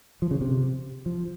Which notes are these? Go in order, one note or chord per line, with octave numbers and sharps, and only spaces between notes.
F3
C#3
C3
F3